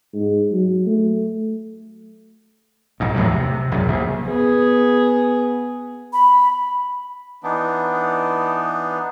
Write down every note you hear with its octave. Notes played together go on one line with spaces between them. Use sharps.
G#2
F#3
A3
A#1 G#2
E2 A2 C3 F#3
C3
A#1 F#2
A#1
B3 G#4
B5
E3 B3 D4 D#4